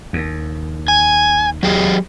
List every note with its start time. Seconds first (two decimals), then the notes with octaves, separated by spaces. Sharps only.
0.13 D#2
0.88 G#5
1.63 F#3 G4 G#4